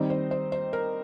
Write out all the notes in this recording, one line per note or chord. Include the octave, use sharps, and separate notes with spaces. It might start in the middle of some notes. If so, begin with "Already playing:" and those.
Already playing: D#3 G3 C4 D#4 D#5
C5
C5
C5
A#4